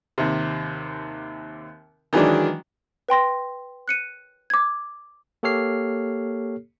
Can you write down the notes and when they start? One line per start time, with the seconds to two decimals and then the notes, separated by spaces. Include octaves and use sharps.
0.18 D#2 C3
2.13 D#3 E3 F#3 G#3 D4
3.09 B4 G5 C6 A#6
3.88 F#6 C#7 D#7
4.50 D6 G#6
5.43 A#3 G4 A4 C#5 F6 C7